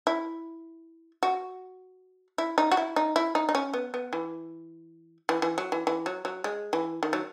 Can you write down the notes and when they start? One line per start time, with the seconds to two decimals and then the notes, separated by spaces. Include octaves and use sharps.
0.07 E4
1.23 F#4
2.38 E4
2.58 D#4
2.71 F#4
2.77 E4
2.96 D#4
3.16 E4
3.35 D#4
3.49 D#4
3.55 C#4
3.74 B3
3.94 B3
4.13 E3
5.29 E3
5.42 E3
5.58 F#3
5.72 E3
5.87 E3
6.06 F#3
6.25 F#3
6.44 G#3
6.73 E3
7.03 D#3
7.13 F#3